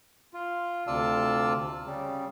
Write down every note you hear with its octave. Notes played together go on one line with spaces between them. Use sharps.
F4
D2 C3 F4 D5 A5 E6
C#3 G3